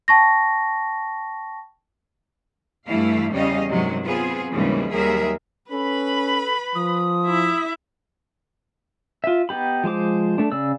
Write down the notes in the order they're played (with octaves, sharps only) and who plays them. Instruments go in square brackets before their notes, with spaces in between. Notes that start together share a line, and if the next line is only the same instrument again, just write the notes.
[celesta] G5 A5 C#6 A#6
[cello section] G2 E3 A3 E4 F5
E2 C#3 G3 C#4 D#5 F5
G2 C3 D#3 F#3 G#3
B3 C4 F4 G#4
D#2 G#2 C#3 E3 F3 G3
D#2 F#3 G3 G#4 A#4 E5
[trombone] C#4 [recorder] A4 [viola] B4 B5
[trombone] F3 [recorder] D#6
[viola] E4 E5
[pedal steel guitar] F4 E5
B3 D#4 G4 B5
F3 G#3 C5 D6
A3 D4
C#3 D5 E6